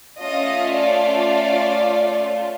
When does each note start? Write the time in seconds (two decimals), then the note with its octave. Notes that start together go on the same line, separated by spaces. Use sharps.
0.20 A3 C#4 F4 D#5
0.76 D5